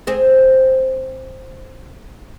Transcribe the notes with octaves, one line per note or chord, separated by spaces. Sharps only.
C4 G#4